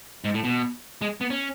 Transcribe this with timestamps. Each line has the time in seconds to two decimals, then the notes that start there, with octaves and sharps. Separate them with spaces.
0.25 G#2
0.34 A2
0.44 B2
1.02 G#3
1.21 B3
1.30 C#4